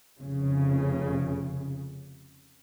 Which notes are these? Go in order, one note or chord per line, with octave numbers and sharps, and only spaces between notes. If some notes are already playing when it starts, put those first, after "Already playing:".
F1 C#3